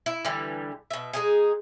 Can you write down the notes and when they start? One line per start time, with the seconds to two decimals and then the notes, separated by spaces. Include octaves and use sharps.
0.06 E4
0.25 D3 E3 G3
0.90 B2 E5
1.13 G#3 D#4 G#4